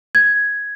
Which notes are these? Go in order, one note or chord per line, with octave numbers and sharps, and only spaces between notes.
G#6